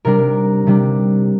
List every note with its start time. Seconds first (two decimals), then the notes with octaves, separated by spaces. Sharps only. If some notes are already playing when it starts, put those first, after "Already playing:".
0.05 C3 G3 D4 A#4
0.67 C3 G3 D4